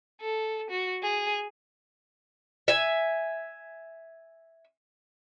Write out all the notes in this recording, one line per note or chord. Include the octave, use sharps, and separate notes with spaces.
A4
F#4
G#4
E5 G#5